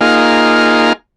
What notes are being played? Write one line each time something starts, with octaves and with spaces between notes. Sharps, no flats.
A#3 D#4 F4 G#4 F6